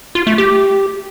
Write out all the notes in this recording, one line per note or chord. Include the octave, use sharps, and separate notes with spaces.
F4
A3
G4